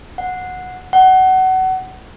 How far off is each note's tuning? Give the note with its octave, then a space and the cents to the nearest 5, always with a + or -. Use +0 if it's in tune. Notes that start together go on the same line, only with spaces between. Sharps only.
F#5 -15
F#5 +25